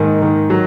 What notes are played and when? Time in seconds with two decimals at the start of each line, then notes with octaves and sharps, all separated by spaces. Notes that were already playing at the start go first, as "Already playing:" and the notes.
Already playing: G#2 D#3 A#3
0.22 D#3
0.50 F#3